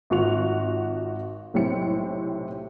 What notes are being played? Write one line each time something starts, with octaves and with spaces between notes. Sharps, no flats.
G#1 F4 F#4 C#6 F7
B1 A2 C3 C4 C#7